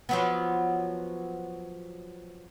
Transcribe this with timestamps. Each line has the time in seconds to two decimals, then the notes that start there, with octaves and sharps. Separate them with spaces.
0.09 F3 F#3 B3